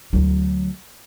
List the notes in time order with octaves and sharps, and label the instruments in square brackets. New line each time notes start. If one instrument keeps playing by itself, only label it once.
[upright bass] D2 F#3